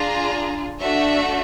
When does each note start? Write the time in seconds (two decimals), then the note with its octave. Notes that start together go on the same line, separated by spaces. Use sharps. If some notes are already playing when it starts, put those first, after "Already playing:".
Already playing: D4 F4 G#4 A#5
0.81 A3 D4 F#4 E5